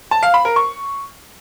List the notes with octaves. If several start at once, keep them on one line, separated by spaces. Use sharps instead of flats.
A5
F5
B5
A#4
C#6